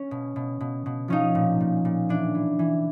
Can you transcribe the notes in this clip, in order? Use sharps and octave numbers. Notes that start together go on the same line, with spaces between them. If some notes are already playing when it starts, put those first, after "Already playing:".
Already playing: C#4
B2
B2
B2
B2
F3 C#4 D#4
A#2
A#2
A#2
E3 D4
E3
E3